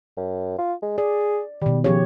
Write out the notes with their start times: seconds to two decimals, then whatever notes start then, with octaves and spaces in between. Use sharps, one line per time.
0.17 F#2
0.58 F4
0.82 G#3
0.98 G#4 D5
1.62 B2 D#3 G3
1.84 C#3 F3 G4 C#5